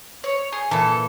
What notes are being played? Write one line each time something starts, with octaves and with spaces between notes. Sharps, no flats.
C#5
G#4
A#2 E3 A4